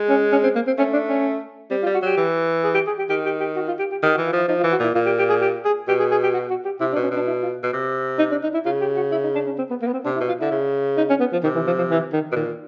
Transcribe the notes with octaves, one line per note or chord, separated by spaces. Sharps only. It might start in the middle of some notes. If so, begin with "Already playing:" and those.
Already playing: G#3
C#4
C#4
C4
A#3
C4
A3 C#4
D4
C#4
G3 C4
F4
G3
F#4
F#3 G4
E3
G#4
G4
G#4
G4
D#3 G4
G4
G4
F#4
F4
G4
G4
D#3 G4
F#4
E3
F4
F3 E4
F3 D#4
F4
E3
F#4
A#2 E4
A#2 F4
G4
G4
G#4
G4
G#4
B2 G4
G#4
G#4
G4
F#4
F#4
G4
C3 E4
D4
B2
C#4
B2 D4
E4
F4
B2
C3
D#4
D4
D#4
E4
C#3 F4
G4
F#4
E4
D#4
D4
C#4
C4
B3
A#3
B3
C4
C3 D4
E4
B2
F4
D3 E4
C#3
D#4
C#4
B3
F3
C3 D#3
E3
F3
F3
E3
D#3
B2
A#2 D#3